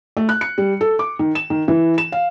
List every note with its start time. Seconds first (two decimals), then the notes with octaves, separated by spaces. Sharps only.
0.17 A3
0.29 F#6
0.41 C#7
0.58 G3
0.81 A4
0.99 D6
1.19 D#3
1.35 E7
1.50 D#3
1.68 E3
1.98 E7
2.12 F5